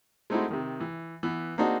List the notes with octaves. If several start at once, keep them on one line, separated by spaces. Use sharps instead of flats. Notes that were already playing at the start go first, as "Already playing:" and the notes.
G#3 A3 C4 D#4 E4 F#4
C3 D#3
E3
E3 B3
A#3 C4 D4 D#4 F#4 G#4